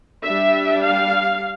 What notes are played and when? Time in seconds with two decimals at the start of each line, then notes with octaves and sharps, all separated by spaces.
0.25 G3 D4 E5
0.83 F5